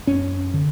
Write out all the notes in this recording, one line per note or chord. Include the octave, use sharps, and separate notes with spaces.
F#2 C#4
D3